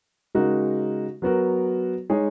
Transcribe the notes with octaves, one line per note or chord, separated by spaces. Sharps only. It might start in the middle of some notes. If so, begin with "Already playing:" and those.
C#3 G#3 D#4 F#4 A#4
F#3 B3 F#4 A#4
G#3 D#4 G#4 C#5